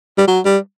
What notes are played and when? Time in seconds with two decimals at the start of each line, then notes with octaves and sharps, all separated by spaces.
0.18 G3
0.27 F#3
0.45 G3